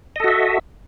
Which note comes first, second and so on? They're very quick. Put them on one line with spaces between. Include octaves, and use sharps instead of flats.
D#5 A4 F#4 E5